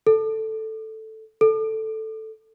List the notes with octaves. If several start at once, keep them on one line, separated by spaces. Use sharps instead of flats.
A4
A4